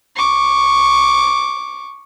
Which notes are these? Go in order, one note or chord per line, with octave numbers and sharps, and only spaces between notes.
C#6 D6